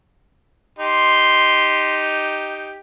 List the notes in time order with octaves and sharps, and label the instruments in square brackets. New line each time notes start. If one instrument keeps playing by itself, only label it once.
[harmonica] D#4 G4 [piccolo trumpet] C6